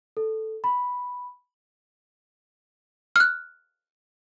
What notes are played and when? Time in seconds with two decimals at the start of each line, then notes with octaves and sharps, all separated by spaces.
0.17 A4
0.64 B5
3.16 F6 F#6